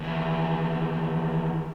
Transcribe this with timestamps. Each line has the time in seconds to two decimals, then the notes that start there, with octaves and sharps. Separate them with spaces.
0.01 D#2 E3